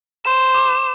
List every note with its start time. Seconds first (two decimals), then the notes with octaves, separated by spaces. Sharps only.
0.25 C5 E7
0.54 D6